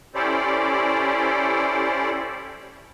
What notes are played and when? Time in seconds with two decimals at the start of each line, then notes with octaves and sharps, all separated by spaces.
0.15 C#4 E4 G4 A4 C5 D5